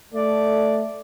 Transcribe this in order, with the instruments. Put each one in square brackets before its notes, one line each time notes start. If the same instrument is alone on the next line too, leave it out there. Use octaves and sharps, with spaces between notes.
[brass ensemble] A3 [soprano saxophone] D5